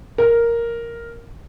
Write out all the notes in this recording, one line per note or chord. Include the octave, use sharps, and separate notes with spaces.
A#4